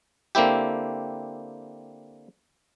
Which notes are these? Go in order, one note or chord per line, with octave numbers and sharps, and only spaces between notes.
D3 A#3 C4 E4 G4